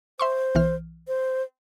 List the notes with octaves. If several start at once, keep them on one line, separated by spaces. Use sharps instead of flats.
C5 E5 C6 C#6
B1 E3 F6
C5